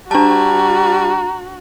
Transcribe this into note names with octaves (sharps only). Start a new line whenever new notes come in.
G3 D4 F#4 A5 A#5